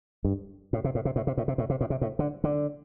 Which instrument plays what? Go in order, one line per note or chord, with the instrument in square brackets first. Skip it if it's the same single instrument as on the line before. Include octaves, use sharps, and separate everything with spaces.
[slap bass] G2
A2
C3
A2
C3
A2
C3
A2
C3
A2
C3
A2
C3
A2
D3
D3